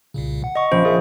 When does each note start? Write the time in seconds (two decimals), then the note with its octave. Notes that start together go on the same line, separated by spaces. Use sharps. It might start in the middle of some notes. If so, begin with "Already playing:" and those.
0.14 C2 A#2 C#3
0.44 F#5
0.55 D#5 C#6
0.72 A#1 C#4 C5
0.85 G#4 A#4 E5